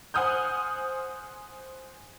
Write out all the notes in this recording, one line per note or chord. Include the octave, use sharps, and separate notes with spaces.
C5 F#5 G#5 D#6 F6 G6